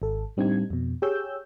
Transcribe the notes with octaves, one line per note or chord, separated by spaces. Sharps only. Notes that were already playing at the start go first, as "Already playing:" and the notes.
G#1 A4
A2 G3 C4 D4 D#4 G#6
F2 B2
G4 G#4 C#5 E6 G6